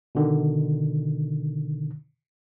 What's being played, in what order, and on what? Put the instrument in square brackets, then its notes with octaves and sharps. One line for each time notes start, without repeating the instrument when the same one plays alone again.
[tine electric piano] B2 D3 D#3